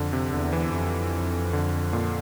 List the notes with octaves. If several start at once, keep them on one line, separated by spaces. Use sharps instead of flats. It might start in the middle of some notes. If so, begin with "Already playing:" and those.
Already playing: F2 D3
C3
E2 D3
E3
F2
D3
A#2